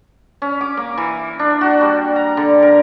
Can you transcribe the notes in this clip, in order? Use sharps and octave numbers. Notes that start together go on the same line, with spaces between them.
C#4
D6
A#3
E3
D4
F#4
G3
A#5
D3
A#4